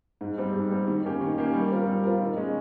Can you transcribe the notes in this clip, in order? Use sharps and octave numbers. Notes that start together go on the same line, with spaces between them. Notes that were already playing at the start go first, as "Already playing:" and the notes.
G#2
G3 C4
G#2
G3 C4
D#3
A#3 C#4 G4
D#3
A#3 C#4 G4
G3
C4 F4 A#4
G3
C4 F4 A#4
D#3
G#3 C#4